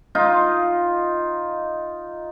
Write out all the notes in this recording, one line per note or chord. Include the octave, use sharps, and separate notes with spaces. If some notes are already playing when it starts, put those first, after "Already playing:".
D#4 F4